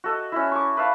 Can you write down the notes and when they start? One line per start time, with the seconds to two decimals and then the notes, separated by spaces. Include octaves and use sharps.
0.04 F#4 A4 D#5
0.32 C#4 E4
0.52 C#6 D6
0.77 B4 E5 F5 A5